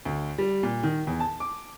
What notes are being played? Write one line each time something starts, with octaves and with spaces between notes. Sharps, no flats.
D2
G3
A#2
D#3
E2
A5
D6